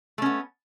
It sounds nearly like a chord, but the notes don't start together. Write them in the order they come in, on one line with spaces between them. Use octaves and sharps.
A3 C#4 B3